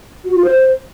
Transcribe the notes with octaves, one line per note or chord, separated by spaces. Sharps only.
F#4
F4
C5